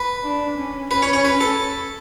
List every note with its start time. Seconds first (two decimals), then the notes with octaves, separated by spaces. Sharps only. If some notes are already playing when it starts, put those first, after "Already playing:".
Already playing: B4
0.24 D4
0.58 C#4
0.91 C#4 B4
1.02 C#5
1.13 C#5
1.25 B4
1.41 A4